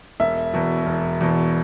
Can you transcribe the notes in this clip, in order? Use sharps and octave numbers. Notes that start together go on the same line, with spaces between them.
E1 E5
E2 B2
E1
E2 B2